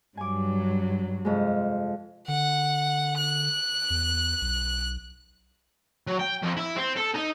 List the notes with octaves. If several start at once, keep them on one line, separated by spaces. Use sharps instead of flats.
G2 F#3 G#5 D6
F2 C3 G#3
D3 F#5
F#6
E2
B1
F#3
G5
F2
E4
C4
A4
D#4